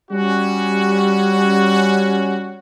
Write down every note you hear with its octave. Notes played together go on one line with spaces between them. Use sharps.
G3 C#4 F#4